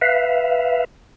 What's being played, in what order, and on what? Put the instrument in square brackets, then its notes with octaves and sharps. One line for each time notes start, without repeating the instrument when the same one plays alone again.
[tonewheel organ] B4 E5 F5